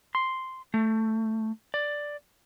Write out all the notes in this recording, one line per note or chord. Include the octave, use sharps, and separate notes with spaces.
C6
A3
D5